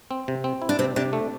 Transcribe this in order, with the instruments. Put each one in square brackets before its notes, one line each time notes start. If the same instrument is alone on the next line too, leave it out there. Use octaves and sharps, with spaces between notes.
[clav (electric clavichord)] C4
C3
C4
E4
[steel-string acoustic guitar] D4
[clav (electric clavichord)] C3 [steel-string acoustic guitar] C4
[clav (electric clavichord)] C3 [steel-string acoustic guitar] D4
[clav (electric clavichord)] A3